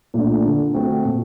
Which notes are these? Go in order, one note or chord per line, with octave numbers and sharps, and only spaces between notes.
A#2 A3 D4
D3
A3 C4 F#4 A4
A#2